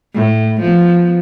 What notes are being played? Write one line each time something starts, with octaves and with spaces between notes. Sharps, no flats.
A2
F3 B3